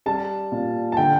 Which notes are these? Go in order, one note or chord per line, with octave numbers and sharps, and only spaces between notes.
G3 A5
A#2
A5
D3 G5